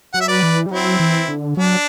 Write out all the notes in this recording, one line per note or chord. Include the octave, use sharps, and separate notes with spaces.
F#3 F#5
E5
B4 D5
E3
G3
F#3 C4 E4
E3
D3
F#3 D4